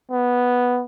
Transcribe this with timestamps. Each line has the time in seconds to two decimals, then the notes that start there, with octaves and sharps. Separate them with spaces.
0.11 B3